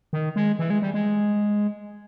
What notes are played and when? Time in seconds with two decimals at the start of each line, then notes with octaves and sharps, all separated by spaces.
0.13 D#3
0.36 G#3
0.59 E3
0.70 G#3
0.82 G3
0.94 G#3